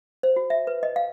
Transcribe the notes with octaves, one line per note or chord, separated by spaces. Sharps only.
C5
F#4
E5
B4
D#5
F5